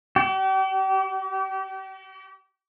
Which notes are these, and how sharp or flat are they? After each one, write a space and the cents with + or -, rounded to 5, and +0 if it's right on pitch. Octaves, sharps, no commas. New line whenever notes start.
G4 -40